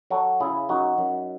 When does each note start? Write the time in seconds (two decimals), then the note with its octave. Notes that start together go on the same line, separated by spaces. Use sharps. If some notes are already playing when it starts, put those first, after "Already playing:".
0.10 F#3 F#4 A4
0.40 C#3 E4 G#4
0.69 F#2 D#4 F#4
0.98 F#2